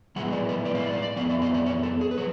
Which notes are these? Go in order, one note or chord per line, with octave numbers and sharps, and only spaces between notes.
A2 F3 G#3 B3 F#5
D5
B4
D5
F5
D5
F5
D5
F2 F3 B3 F5
D5
F5
D5
C#5
A4
G#4
B4
F3 C#5